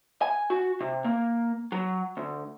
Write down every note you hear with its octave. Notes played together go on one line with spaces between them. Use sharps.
G#5
F#4
C3
A#3
F#3
D2